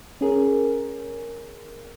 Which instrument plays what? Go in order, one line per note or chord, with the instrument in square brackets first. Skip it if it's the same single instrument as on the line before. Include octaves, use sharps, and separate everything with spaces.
[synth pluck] C#4 G#4 A#4